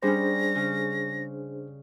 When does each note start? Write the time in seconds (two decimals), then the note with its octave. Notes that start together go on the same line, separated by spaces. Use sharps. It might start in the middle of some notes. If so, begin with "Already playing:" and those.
0.02 G3 C#4 D4 G#4 C5 A#6
0.55 C#3